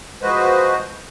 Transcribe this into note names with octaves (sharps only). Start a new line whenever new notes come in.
F3 G#3 F#4 B4 C5 D#5